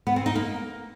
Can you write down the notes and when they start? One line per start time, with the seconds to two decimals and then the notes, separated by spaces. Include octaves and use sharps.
0.07 B3
0.16 C4
0.26 D#4
0.35 A#3